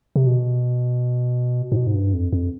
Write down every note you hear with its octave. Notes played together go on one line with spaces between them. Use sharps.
C3
B2
G#2
B2
G#2
G2
F2
F2